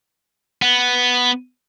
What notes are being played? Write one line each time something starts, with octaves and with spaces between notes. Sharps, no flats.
B3